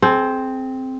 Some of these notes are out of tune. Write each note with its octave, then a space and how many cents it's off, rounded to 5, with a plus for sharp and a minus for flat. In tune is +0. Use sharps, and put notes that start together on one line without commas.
C4 +0 G#4 +35